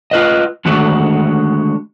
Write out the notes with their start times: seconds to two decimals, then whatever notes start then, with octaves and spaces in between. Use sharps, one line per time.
0.11 F4 B4 D#5
0.65 D3 D#3 G#3 A3 F#4